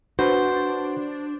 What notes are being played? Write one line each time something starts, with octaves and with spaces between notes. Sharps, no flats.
D4 F#4 B4 C5